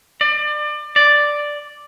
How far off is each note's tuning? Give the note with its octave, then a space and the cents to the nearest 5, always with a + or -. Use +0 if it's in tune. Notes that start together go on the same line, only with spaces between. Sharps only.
D5 +30
D5 +0